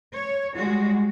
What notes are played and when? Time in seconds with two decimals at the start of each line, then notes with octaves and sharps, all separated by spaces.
0.13 C#5
0.55 G3 G#3 F#4